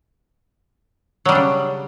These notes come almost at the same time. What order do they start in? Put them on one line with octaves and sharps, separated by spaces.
F#3 G3 D4 C#3